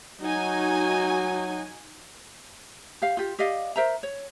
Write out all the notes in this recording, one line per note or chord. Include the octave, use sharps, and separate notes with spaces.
F#3 D#4 F#4 G#5
G4 F5
F4 G4
G4 D5 D#5 F5
A#4 C5 E5 A#5
C#5